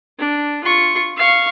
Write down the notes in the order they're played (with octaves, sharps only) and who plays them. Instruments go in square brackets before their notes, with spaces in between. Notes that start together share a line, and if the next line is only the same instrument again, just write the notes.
[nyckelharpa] D4
F4 C#6
F5 C#6